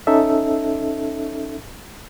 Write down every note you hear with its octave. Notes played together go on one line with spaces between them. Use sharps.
C#4 D#4 A4 E5